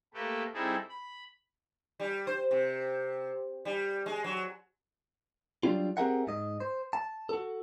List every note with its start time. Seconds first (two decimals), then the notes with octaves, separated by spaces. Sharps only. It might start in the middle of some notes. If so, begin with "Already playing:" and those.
0.14 A3 A#3 G4 A4 B4
0.54 G3 C4 D#4 E4 G#4 A4
0.89 B5
2.00 G3
2.27 C5
2.51 C3
3.65 G3
4.06 G#3
4.24 F#3
5.63 F#3 G3 C#4 D4 F4
5.97 C4 G4 G#4 A#4 E5 F#5
6.27 G#2 D#5
6.60 C5
6.93 A5
7.29 F#4 A4